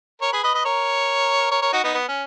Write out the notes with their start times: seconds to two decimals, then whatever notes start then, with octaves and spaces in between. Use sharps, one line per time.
0.21 A#4 C#5
0.33 G#4 B4
0.43 B4 D#5
0.54 B4 D#5
0.65 A#4 C#5
1.51 A#4 C#5
1.62 A#4 C#5
1.73 D#4 F#4
1.83 B3 D#4
1.94 B3
2.08 C#4